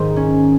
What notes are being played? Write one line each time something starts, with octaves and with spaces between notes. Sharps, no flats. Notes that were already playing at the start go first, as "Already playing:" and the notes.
Already playing: G#2 D#3 D#4
C#4